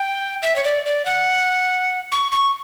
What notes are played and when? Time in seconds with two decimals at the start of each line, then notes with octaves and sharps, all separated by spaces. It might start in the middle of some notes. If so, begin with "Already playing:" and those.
Already playing: G5
0.43 E5
0.56 C#5
0.64 D5
0.86 D5
1.06 F#5
2.12 C#6
2.32 C#6